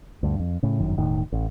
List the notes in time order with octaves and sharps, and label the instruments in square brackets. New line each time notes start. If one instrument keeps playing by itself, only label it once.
[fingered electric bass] D2 G2
F2
A2 C#3
G1 F#2 D#3
E1 A2 D#3
A1